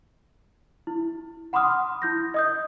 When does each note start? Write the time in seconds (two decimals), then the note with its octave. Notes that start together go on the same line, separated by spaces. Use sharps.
0.87 E4
1.53 F#5 B5 C6 D6 D#6 F6
2.02 E4 G6 A#6
2.34 D#5 D#6 G6